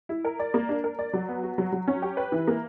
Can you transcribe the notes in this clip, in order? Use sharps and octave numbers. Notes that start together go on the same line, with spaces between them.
E4
A#4
D5
A#3
D4
A#4
D5
F#3
B3
F#4
F#3
F#3
C#4
G4
B4
E3
A#3